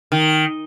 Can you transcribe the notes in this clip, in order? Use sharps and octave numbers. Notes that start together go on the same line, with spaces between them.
D#3